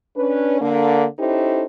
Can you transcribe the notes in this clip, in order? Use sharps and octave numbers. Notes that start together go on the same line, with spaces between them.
C#4 D4 B4
D3 A#3 D4
C#4 D#4 E4 G4 A4 C5